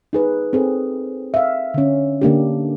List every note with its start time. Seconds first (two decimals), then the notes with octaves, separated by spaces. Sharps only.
0.13 D#4 G#4 B4
0.53 C4 G#4 A4
1.34 E5 F5
1.74 D3 C#4
2.21 D3 A#3 D4 G4